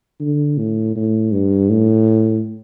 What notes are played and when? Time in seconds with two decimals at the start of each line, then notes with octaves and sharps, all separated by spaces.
0.20 D3
0.58 A2
0.96 A2
1.32 G2
1.70 A2